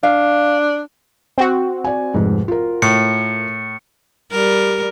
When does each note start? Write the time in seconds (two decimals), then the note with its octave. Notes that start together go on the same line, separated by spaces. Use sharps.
0.03 D4 F5
1.38 C4 F#4
1.84 D5 G#5
2.14 F1 G#2
2.48 F4 A#4
2.82 A2 C#7
4.32 G3 A#4